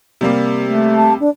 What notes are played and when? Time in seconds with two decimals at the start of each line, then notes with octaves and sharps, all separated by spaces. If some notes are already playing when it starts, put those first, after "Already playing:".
0.21 C3 G3 A#3
0.64 A3
0.96 A5
1.20 D4